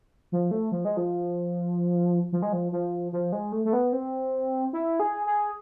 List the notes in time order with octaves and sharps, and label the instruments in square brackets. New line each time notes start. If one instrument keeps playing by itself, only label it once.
[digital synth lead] F3
A3
F3
G#3
F3
F3
G#3
F3
F3
F3
G#3
A3
A3
B3
C4
E4
G#4
G#4